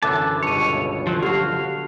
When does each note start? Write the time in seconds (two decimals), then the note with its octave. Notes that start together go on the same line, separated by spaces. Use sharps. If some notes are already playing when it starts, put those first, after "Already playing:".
0.03 F#2 D3 E3 E5 A5 D6 F#6
0.43 G1 C#2 B2 C#5 C#7 D#7
1.07 F3 F#3
1.23 D3 F#4 G4 F5 C7